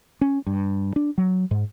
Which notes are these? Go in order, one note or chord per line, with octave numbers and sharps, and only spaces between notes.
C#4
G2
D4
F#3
G#2